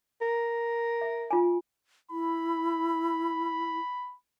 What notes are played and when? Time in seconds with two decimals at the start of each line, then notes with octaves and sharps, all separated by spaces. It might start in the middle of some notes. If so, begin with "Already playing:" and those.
0.21 A#4
1.01 E5
1.31 F4 G#5
2.11 E4 B5